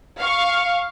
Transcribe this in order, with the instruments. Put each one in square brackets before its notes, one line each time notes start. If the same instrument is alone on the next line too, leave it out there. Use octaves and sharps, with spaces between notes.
[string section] F5 C#6